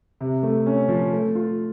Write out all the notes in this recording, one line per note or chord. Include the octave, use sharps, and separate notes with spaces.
C3
A3
C#4
F3
A3
F4